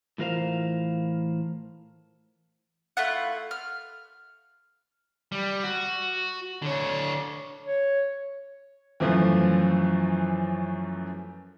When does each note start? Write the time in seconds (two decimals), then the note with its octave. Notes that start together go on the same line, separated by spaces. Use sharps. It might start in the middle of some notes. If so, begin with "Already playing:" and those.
0.18 A2 E3 F4 A#4 C5 F5
2.97 A3 E4 F4 F#5
3.51 F6
5.32 G3
5.64 F#4
6.62 D3 C#5
7.66 C#5
9.00 F#2 E3 F3 A3 C5